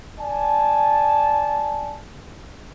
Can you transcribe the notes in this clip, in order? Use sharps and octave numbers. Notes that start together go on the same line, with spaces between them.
D5 G#5 A5